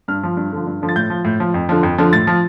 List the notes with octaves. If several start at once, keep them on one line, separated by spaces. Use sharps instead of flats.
G2 F6
F3
G2
D3 F3
G2
D3 F3
A6
A2 G6
F3
A2
F3
F2
D3 F3
F2
D3 F3
A2 A6
F3